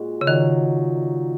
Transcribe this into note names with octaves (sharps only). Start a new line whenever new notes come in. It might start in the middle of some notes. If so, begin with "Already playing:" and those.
Already playing: A#2 G#3 F#4
C#3
A#2 D#3 F#3 D#4